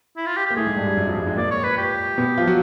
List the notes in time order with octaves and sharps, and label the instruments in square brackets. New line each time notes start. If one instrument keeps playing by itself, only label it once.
[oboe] E4
F4
G4
G4
[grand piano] A#3
[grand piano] A2 A3 [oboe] G#4
[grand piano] G#2 G#3
G2 G3
G2 G3
F#2 F#3
F2 F3
G2 G3
G#2 G#3
[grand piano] A#2 A#3 [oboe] D5
[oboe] C#5
B4
G4
[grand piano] B2 B3
F3 F4
F#3 F#4